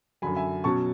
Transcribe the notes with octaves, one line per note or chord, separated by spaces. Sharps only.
F#2 D3 F#3 G#5 B5
E5 G#5
B2 F#3 C#4 A5 C#6